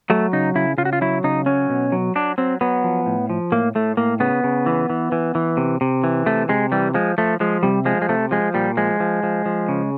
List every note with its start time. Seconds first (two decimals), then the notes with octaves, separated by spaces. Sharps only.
0.10 F#3 A3
0.33 C#3 D#4
0.55 C#3 E4
0.78 C#3 F4
0.85 F#4
0.93 F4
1.01 F#3 E4
1.24 C#3 D#4
1.46 F#3 C#4
1.70 B2
1.92 F#3
2.15 F#3 D4
2.38 F#3 C4
2.61 F#3 B3
2.84 F3
3.06 A2
3.30 F3
3.52 A2 A#3
3.75 A2 A3
3.97 A2 A#3
4.20 C#3 B3
4.44 C#3
4.66 E3
4.90 E3
5.12 E3
5.35 E3
5.57 C3
5.81 C3
6.04 E3
6.26 C3 A3
6.49 C3 G#3
6.72 E3 G3
6.94 F3 G#3
7.18 F3 A3
7.40 F3 G#3
7.63 C3 G3
7.85 F3 G#3
8.02 G#3
8.09 C3 A3
8.31 F3 G#3
8.54 A#2 G3
8.77 F3 G#3
9.00 F3
9.23 F3
9.46 F3
9.69 C#3